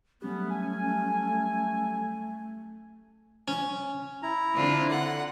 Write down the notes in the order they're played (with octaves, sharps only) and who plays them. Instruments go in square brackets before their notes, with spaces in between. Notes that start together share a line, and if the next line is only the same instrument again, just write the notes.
[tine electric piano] F#3 G3 G4 [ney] A3 [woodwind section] B3 [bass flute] C#4
[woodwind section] G#5
[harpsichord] C#4
[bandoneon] E4 A#5
[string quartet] D3 C4 F4
[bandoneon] D3 [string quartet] F#5